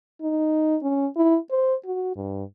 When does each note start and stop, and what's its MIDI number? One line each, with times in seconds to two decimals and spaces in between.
0.22 0.77 63
0.83 1.07 61
1.17 1.38 64
1.51 1.75 72
1.85 2.14 66
2.16 2.44 43